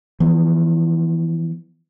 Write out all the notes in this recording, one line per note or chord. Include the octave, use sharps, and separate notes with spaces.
E3 F3 B3